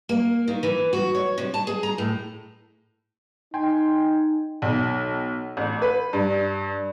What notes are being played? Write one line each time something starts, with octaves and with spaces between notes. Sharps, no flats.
A#3
D#3
E3
F#4
C#5
C3
A5
G#4
A#5
A2
D#4 G5 G#5 C6
B1
A1
B4
G2